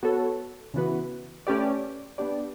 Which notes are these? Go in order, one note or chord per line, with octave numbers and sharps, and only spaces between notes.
B3 F#4 A4 C#5
C#3 E3 B3 F#4 B4
A3 C#4 G4 B4 D5
B3 D4 G4 D5